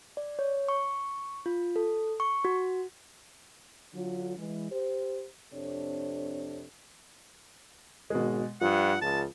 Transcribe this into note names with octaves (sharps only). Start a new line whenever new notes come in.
D5
C#5
C#6
F4
A4
C#6
F#4
D3 F#3 F4
E3 G#3
G4 C5
F2 C3 D4 A4 C#5
G#1 B2 G#3
G2 F3 F#5
C#2 A5